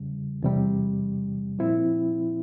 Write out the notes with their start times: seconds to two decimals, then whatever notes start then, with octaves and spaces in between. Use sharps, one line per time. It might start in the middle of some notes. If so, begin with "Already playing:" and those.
Already playing: E2 C#3 G3
0.43 E2 C3 G3
1.59 A#2 F3 C4 E4